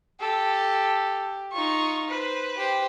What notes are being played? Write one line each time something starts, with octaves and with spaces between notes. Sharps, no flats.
G4 A4
D#4 F4 C#6
B4 C5
G4 C5